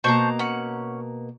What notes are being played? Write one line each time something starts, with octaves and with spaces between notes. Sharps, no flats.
B2 A#3 C5 A5 A#5 C#6
C#4 F#5